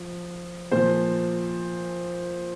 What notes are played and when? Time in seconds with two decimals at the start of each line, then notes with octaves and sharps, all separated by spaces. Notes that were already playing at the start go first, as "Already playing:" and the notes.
Already playing: F3
0.72 A#2 F3 C5